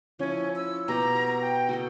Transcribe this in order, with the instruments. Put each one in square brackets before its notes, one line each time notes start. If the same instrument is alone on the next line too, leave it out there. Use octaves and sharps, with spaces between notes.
[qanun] F3 E4 [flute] C#4
[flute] E6
[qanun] B2 G4 [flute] A#5
[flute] A#5
G5
[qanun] F#4 A4 D#5